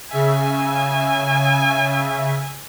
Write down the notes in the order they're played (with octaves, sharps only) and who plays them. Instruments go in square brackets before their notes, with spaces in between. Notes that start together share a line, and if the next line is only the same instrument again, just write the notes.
[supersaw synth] C#3 E5 [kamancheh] G#5